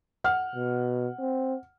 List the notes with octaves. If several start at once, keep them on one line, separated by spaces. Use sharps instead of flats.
F#5 F6
B2
C4